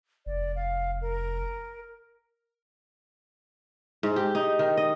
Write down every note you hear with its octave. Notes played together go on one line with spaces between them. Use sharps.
F1 D5
F5
A#4
G#2
G4
D#4
D#3
D#5